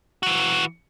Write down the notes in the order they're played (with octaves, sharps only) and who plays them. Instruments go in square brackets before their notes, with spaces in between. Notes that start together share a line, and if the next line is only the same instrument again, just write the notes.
[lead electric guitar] E3 F#4